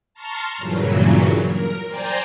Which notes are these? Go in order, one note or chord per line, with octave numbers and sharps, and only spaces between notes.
A5 A#5 C6 C#6 F6
G2 A#2 C#3 E3 F#3
A#4
C5 D5 G5 G#5 A#5